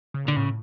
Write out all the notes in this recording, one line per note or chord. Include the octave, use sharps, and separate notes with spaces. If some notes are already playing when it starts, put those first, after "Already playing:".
C#3
A#2 D3
A2 C#3